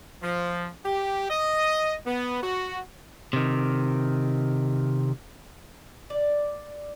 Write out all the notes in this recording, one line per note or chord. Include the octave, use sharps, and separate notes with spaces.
F3
G4
D#5
B3
F#4
C3 D#3
D5